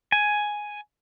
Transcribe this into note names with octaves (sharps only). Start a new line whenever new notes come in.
G#5